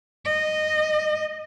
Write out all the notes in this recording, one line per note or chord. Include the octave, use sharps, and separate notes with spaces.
D#5